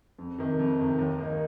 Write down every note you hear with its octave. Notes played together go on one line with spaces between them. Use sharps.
F2
C3 D#3
F2
C3 D#3
D#2
D#3 A#3 D#4